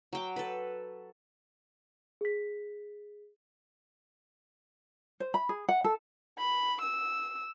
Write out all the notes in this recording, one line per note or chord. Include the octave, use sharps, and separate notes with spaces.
F#3 G5 D6
A4 B4
G#4 B6
C5
B5
G#4
F#5
A4
B5
E6